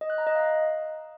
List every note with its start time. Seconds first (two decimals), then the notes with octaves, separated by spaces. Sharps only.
0.01 D#5
0.10 F#6
0.18 A#5
0.27 D#5
0.35 F5